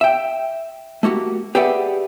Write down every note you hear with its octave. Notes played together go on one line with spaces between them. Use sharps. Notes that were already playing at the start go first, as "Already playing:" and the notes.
E5 G5
A3 A#3 F#4 G4
G4 G#4 B4 D5 E5 F#5